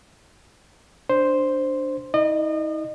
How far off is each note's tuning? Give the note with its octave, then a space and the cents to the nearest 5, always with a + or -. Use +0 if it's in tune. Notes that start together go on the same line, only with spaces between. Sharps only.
D4 +0 C5 +0
D#4 +45 D#5 -35